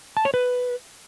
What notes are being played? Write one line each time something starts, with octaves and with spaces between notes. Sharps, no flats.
A5
C#5
B4